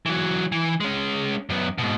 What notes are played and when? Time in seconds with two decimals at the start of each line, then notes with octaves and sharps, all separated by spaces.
0.06 E3 F#3
0.52 E3
0.81 G#3 C#4
1.50 F#2 B3
1.78 G#2 B2